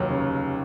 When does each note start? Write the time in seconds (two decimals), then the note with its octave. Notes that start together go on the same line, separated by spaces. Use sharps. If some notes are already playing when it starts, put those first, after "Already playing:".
Already playing: F1 D#2 F#3
0.10 C#3